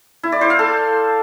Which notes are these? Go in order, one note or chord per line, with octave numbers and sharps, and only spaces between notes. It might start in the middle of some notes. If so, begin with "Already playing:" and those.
E4
D5
C5
F5
A4